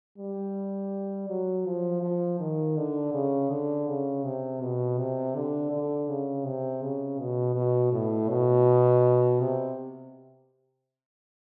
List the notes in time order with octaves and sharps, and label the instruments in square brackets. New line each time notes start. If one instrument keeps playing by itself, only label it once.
[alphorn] G3
F#3
F3
F3
D#3
D3
C#3
D3
C#3
C3
B2
C3
D3
D3
C#3
C3
C#3
B2
B2
A2
B2
C3